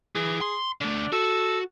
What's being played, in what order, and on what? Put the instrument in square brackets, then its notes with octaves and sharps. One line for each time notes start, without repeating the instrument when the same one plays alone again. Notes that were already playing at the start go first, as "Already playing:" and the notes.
[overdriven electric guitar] E3 [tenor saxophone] G#4
[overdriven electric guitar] C6
[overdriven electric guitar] D3 A3 [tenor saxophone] D4
[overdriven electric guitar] F#4 [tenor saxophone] A4